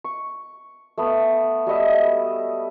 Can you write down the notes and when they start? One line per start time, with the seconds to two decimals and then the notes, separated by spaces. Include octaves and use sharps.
0.04 C#6
0.98 A3 B3
1.67 G3 F#4 D#5 E5